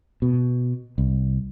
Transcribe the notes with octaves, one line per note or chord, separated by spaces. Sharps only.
B2
C2